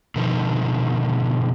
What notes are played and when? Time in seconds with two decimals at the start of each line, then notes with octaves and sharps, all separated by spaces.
0.16 B2 D3 D#3 F3